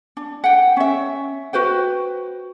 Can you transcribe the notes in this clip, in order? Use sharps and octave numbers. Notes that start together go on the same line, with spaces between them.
D4
F#5 G5
C#4 E5
F#4 B4 C5 G5